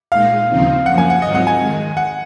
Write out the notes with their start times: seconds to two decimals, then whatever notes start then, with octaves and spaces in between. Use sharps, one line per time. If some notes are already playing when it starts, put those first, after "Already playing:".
0.12 A#2 G#3 D#4 F5
0.49 D#2 C#3 F3 C4 D#4
0.85 F#2 F3 A#3 F#5
0.98 G#5
1.10 F#5
1.22 G#2 D#3 F#3 C4 F4 D#5
1.35 F#5
1.47 G#5
1.59 F2 D#3 G#3
1.97 F#5